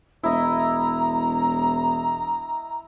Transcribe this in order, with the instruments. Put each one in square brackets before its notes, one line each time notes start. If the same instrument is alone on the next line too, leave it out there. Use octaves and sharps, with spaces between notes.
[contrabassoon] E1 [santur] E4 D#5 [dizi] A#5